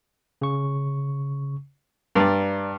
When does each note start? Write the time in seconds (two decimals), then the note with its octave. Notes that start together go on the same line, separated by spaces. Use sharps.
0.41 C#3 C#6
2.15 G2 D5 A#5